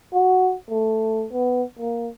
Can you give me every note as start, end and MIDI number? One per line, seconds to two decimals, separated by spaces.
0.13 0.55 66
0.70 1.26 57
1.32 1.63 59
1.79 2.09 58